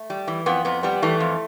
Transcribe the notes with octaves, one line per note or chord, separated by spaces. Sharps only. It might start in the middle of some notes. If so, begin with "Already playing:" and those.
Already playing: A3
G3
E3
F2 B3
F2 B3
G3 B3
E3 A3
F2